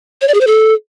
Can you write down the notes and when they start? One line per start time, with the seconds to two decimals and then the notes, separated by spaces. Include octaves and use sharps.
0.22 C#5
0.28 D5
0.34 G#4
0.41 C5
0.47 A4